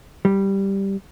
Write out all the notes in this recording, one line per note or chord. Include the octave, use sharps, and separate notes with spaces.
G3